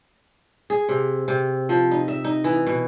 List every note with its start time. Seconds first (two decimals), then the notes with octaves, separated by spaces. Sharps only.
0.70 G#4
0.89 C3
1.28 C3
1.69 F3
1.91 D#4
2.08 E5
2.24 D#4
2.44 E3
2.67 B2